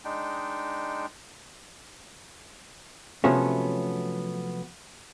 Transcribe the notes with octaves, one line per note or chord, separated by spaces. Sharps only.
G#3 D4 D#4 G5
C3 F3 F#3 A3 B3 C#4